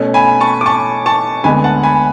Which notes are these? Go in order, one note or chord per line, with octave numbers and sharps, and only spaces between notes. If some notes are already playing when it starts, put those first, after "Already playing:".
Already playing: B2 A3 C#4
G#5 B5
A5 C#6
D6
A5 C#6
A5 C#6
D2 D3 G#3 B3 G#5 B5
F#5 A5
G#5 B5